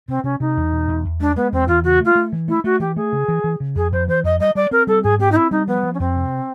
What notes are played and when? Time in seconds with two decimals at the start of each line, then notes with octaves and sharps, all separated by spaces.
0.08 C3 C4
0.24 C3 C#4
0.40 C3 D#4
0.57 E2
0.72 B2
0.88 E2
1.05 E2
1.20 G#3 D4
1.36 G#3 B3
1.52 E2 C4
1.68 E2 F4
1.84 C#3 F#4
2.00 A3
2.05 F4
2.15 A3
2.33 E3
2.48 A3 E4
2.64 A3 F#4
2.80 E3 G4
2.96 A3 G#4
3.13 C#3
3.28 E3
3.44 E3
3.60 C#3
3.75 F2 G#4
3.92 F2 C5
4.08 E3 C5
4.24 F2 D#5
4.39 G3 D#5
4.55 G3 D5
4.71 C4 A#4
4.87 G3 A4
5.03 G#2 G#4
5.19 C4 G4
5.31 D#4
5.36 C4 E4
5.51 G3 D#4
5.67 F3 B3
5.83 F3
5.94 C#4
6.00 F2 C4
6.16 C3